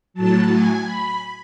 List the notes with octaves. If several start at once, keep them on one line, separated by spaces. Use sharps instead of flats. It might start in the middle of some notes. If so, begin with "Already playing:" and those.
A2 F#3 A5
G#5
B5